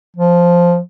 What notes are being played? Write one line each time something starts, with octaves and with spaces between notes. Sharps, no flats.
F3